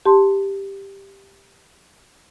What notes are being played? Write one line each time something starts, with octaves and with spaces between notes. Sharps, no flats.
G4 A5 C6